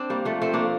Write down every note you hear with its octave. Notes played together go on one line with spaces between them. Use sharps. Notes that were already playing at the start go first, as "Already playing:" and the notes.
Already playing: C4 D4
G3 A#3
F3 A3
A3 C4
A#3 D4